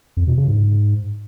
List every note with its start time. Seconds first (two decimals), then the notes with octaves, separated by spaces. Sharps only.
0.17 F2
0.27 B2
0.37 C#3
0.48 G#2